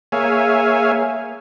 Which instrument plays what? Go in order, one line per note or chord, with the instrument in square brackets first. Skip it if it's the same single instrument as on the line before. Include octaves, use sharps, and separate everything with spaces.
[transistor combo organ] A#3 G#4 C#5 E5 F5 G#5